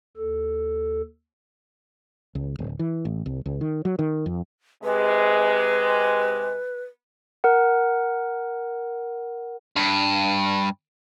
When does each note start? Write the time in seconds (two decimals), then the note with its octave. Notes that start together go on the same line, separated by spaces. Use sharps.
0.17 D#2 A4
2.35 C#2
2.59 D1
2.79 E3
3.05 A1
3.26 C2
3.46 C#2
3.61 D#3
3.85 F#3
3.99 D#3
4.26 F2
4.84 C3 G#3 B4
7.44 A#4 F#5
9.76 G2